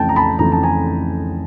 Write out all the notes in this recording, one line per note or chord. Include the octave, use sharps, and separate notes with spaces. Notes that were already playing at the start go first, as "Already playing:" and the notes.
Already playing: F2 C#3 E3 A3 G5 A5
A#5
A5 B5
F2 C#3 E3 A3 A#5
A5
G#5 A#5